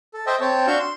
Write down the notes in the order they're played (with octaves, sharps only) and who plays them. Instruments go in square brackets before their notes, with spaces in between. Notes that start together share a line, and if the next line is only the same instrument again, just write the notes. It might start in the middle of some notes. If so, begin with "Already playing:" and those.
[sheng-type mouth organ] A4
A4 C5 D#5 E5 G5 A5
C4 C#5 G5 A5
D4 F#4 F5 C#6 E6 G6
C6